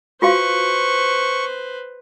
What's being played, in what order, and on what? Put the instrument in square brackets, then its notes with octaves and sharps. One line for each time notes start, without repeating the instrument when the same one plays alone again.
[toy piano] F4 F#4 F5 [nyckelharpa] B4 C5 [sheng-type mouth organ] C#6